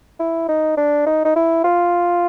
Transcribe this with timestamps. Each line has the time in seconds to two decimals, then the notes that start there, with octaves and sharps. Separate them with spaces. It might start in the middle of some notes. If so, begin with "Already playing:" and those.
0.20 E4
0.49 D#4
0.77 D4
1.07 D#4
1.25 D#4
1.36 E4
1.64 F4